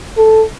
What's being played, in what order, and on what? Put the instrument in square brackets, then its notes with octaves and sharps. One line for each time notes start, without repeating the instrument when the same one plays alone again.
[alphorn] A4